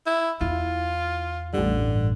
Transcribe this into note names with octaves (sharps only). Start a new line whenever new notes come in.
E4
E2 E4 F4
A1 G2 D3